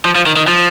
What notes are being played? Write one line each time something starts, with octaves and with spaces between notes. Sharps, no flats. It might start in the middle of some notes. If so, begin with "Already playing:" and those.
F3
F3
D#3
D#3
F3